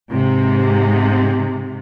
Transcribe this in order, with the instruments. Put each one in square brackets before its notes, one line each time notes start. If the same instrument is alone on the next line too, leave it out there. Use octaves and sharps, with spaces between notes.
[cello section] G#2 C3